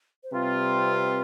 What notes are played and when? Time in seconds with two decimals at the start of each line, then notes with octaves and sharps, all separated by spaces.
0.23 C5
0.31 C3 G3 C4 F4 B4